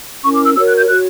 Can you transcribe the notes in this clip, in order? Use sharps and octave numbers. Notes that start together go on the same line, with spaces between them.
C#4 E4 A#4 C#6
D6
E6
F#4 A#4 C#5 E6
F#6
G6
F#4 C#5 F#6